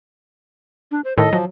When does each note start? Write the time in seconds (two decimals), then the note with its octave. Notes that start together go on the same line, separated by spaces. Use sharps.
0.91 D4
1.05 C5
1.18 A2 D#3 A4 D#5
1.33 F3 F#3